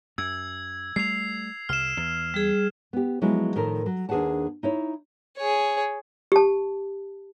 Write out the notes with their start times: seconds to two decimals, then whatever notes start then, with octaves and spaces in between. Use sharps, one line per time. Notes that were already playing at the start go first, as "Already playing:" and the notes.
0.18 F#2 E6 G#6
0.96 G3 A3 C7 F7
1.69 C2 F6 E7
1.97 E2
2.34 G3 G#4
2.93 B3 G4
3.21 F3 F#3 G#3 B3 E4
3.56 A2 D#3 F3 A4 A#4
3.86 F#3
4.09 D#2 D4 G#4 B4 F#5 A5
4.63 D#4 E4 C#5
5.37 G#4 C#5
6.32 G4 A5